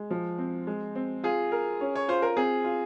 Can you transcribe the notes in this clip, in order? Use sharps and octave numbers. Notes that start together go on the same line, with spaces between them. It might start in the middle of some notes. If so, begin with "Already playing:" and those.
Already playing: G#3
F3
C4
G#3
C4
F4 G#4
A#4
C#4
C#5
F4 C5
A#4
C4 G#4
F4